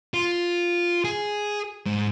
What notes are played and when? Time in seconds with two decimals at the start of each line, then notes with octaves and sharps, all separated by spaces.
0.14 F4
1.04 G#4
1.86 G#2